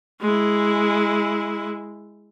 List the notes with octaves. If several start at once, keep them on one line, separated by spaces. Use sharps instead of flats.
G#3 E4